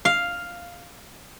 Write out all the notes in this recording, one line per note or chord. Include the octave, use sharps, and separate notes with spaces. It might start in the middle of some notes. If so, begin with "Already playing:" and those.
F5